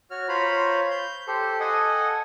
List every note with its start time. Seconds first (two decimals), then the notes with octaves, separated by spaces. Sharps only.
0.11 F#4 C#5 F6
0.28 F4 C5 C#5 A#5 B5
0.91 G6
1.28 G4 A4 C5
1.60 A4 D#5 F#5 G#5